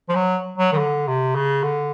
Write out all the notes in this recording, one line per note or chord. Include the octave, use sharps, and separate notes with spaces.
F3
F#3
F#3
D#3
D3
C3
C#3
D3